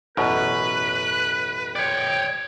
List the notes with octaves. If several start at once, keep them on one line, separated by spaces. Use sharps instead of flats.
A1 F#2 B2 B4 F#6
C#5 D5 G5